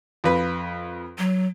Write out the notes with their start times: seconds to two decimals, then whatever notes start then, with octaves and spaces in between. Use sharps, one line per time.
0.24 F2 B4
1.18 F#3